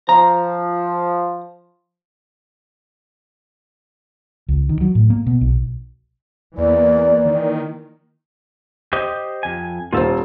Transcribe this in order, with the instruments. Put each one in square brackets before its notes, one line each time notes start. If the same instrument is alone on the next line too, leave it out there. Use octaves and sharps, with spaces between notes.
[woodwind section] F3 [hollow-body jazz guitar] A#5
[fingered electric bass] C#2
D#3
F#3
A2
A#3
B2
B1
[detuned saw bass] E2 [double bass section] E3 A#3 [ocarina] D5
[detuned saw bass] D#3
[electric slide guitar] G4 C5 D#5
F2 G#5
[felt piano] D#1 C5 [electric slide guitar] F4 A4